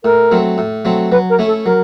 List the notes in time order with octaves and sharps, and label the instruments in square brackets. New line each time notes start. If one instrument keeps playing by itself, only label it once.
[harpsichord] A2 [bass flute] A#4
[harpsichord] F#3 A3 C4
A2
F#3 A3 C4
[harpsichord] F#3 [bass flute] B4
[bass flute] A#4
[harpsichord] A3 C#4 E4
[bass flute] A4
[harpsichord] F#3 [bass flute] A#4